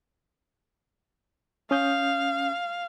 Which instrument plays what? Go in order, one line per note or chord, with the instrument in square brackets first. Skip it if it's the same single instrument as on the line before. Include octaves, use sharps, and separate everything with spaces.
[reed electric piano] C#4 D#6 G6 [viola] F5